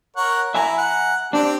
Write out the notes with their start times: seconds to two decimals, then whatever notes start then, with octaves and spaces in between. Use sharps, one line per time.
0.17 A#4 C#5 F#5
0.54 E4 E5 G#5 A#5
0.78 F#5
1.33 C4 D4 G4